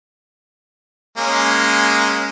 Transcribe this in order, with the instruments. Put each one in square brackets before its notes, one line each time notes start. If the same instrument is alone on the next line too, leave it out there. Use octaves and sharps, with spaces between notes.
[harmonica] G#3 A#3 C#4